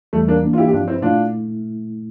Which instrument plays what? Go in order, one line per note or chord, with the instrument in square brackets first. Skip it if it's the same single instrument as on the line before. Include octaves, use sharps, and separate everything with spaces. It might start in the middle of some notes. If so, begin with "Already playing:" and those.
[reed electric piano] E2 E3 G3 [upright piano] A3
[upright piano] A#3 D4
[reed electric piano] E3 A#3 D4
[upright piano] F4
E4 G4
G4
[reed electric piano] G2 F3 C4 [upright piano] D4 F4
[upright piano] C4 E4
[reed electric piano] A#2 A3 E4 [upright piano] D4 F4